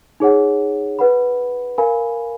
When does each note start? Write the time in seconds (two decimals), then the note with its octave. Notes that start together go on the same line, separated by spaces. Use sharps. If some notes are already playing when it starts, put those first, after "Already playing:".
0.20 D#4 G#4 C#5 F#5
0.99 B4 F#5 B5
1.78 A#4 F5 G#5 B5